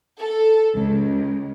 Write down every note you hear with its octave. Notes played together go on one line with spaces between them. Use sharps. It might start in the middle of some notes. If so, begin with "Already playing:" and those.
A4
C#2